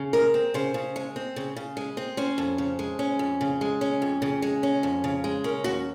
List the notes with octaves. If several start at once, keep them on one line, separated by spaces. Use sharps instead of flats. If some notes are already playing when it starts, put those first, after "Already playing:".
Already playing: C#3
G#3 A#4
C4
C#3 C5
C#3
G#3
C4
C#3
C#3
G#3
C4
C#4 C5
F2
C#3
G#3
C#4
F2
C#3
G#3
C#4
F2
C#3
G#3
C#4
F2
C#3
G#3
C#4 A#4
D#2 F#4